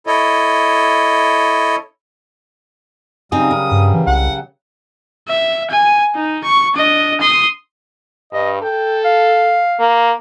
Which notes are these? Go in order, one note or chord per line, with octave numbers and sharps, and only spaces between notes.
E4 A4 C#5 D#5
C#3 F#3 G3 C4 D#4 G#5 D#6
A#4
G2
E3
C2 F#5
E5
G#5
D#4
C#6
D4 D#5
C6 D#6
G2 D#5
A4 G5
F5
A#3